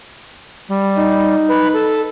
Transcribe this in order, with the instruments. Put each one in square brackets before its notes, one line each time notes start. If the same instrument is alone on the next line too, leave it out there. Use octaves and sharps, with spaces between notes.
[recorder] G3
[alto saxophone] D#4
[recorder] B4
A4